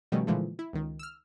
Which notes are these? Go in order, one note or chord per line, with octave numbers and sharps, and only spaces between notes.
B2 D#3 F3 G3 A3 C#4
A#2 D3 E3 F3 G#3 A3
E4
C#2 D#3
E6 F6